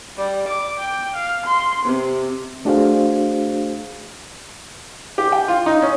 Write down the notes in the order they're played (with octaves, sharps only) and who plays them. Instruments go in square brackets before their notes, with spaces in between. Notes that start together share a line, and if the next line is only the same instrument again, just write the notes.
[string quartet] G3
D6
G5
F5
C6
C3
[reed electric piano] A3 D4 F#4 G#4 C5 F5
[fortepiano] G4
G5
F4
D#4
C#4